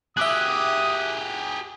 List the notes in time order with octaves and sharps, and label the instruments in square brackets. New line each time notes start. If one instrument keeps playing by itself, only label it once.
[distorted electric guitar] G4 G#4 [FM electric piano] E5 D6 F#6 [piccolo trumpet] D#6